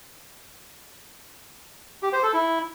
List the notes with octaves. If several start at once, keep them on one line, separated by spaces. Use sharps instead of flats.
G4
C5
A4
E4